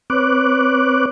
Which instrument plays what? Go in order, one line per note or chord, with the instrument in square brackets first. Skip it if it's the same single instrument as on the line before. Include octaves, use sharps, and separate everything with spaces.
[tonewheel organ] C4 B4 C#5 D6 F#6